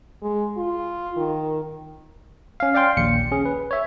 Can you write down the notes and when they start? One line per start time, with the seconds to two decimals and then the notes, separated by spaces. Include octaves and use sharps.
0.22 G#3
0.58 F4
1.17 D#3
2.60 C#4 F5
2.74 D5 F5 G5 C6
2.97 A#1 D#2 C#7
3.32 C#4 G#4
3.46 B4
3.71 C#5 E5